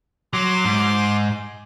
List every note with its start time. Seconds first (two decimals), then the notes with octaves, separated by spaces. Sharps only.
0.33 F#3 C6 D6
0.65 G#2